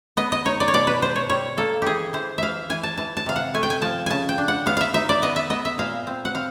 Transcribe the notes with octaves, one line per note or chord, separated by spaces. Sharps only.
B3 D#5
D#5
D#4 C#5
D5
C#5
B2 D5
B4
B2 C5
C#5
G3 C#5
A#3 A4
E3 G4 G#4
E3 C5
E3 E5 F5
E3 G#5
A5
E3 A5
A5
C3 F5
F#5
A3 G#5
G5
G#5
F3 A5
C#3 G#5 A5
G5
D4
F#5
B3 F5
E5 F5
D#4 E5
D5
B3 D#5
E5
B3 D#5
E5
A#2 F5
C4
F#5
C4 F5